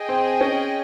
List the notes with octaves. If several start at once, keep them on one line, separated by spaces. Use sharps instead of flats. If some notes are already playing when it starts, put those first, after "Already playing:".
Already playing: G#4 D#5 G5
C4
C#4